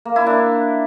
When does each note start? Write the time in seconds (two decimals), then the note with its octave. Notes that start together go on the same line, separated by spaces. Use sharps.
0.05 A#3
0.16 E4
0.26 D4